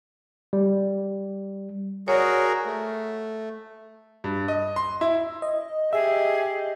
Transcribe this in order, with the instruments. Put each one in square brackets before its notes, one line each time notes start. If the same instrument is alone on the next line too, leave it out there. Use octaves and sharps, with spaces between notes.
[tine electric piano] G3
[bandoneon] F#4 G#4 A#4 [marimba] C#5 D5
[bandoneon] A3
[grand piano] G2
D#5
C6
E4
[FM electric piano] D#5
[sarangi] G4 [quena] G#4 [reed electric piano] E5